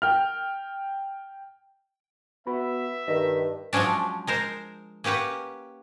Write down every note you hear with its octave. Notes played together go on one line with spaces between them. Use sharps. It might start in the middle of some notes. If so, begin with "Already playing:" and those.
G5 F6
B3 F#4 E5 B5
G2 D#3 D#5
F3 F#3 G#3 C#4 D4
G#3 A#4 C5
A#3 C#4 G4 B4 F#5